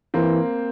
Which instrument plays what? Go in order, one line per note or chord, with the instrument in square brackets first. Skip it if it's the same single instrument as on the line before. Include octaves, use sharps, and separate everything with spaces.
[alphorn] E3 [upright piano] A#3 C4